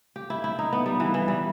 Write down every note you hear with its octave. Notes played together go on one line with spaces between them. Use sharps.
G4
E4
E4
D#4
B3
G3
E3
E3
G3